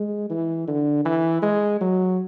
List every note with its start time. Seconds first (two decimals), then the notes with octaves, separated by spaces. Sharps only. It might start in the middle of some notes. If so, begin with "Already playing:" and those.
Already playing: G#3
0.30 E3
0.67 D3
1.05 E3
1.42 G#3
1.81 F#3